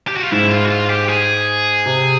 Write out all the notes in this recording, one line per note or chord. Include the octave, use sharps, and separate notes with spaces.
G4
F#4
F4
G#2 E4
F4
F#4
F4
G4
G#4
C3